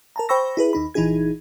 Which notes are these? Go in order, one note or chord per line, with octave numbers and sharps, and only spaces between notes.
A#4 A5 A#5
C5 G5 B5 C#6 E6 A#6
E4 G#4 B4
D#2 D#4 B5
A#1 E3 D#4 E4 G#4 G#6